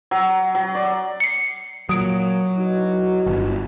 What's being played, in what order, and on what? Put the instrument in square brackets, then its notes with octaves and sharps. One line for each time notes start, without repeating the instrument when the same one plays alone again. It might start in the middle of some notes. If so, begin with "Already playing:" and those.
[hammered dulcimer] F#3
F#3
D5
[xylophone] C7 C#7
[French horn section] A#2 [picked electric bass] F#3 [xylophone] D#6 D7
[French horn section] E3 D#4 F#4
[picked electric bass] G1